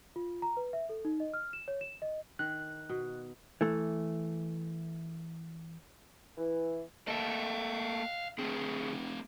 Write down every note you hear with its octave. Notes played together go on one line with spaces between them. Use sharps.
F4
A#5
B4
E5
A4
D#4
D#5
F6
E7
C#5
E7
D#5
D#3 F#6
B2
E3 A3
E3
A3 A#3 A4 D#5 F5
D3 A3 C4 G#4